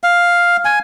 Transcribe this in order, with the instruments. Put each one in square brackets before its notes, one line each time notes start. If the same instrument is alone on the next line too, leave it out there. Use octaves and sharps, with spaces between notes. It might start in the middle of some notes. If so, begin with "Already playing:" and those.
[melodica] F5
G#5